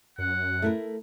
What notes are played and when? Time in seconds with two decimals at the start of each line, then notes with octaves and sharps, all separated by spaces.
0.18 F#2 F#5
0.62 A3 E4 A#4